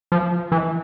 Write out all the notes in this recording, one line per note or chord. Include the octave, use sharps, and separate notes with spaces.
F3
E3